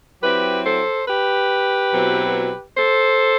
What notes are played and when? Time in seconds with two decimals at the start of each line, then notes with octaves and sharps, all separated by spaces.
0.22 F#3 C4 E4 G4 B4
0.65 A4 C5
1.07 G4 B4
1.92 B2 F#3 C4 E4
2.77 A4 C5